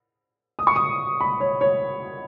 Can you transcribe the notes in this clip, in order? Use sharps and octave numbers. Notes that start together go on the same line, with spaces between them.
D#6
C#6
D#6
B5
C#5
C#5